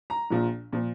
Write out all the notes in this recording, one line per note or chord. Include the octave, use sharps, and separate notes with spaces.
A#5
A#1 A#2 F3
A#2 F3